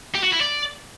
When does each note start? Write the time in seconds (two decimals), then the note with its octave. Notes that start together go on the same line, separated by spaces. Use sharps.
0.15 G4
0.23 F#4
0.32 E4
0.41 D5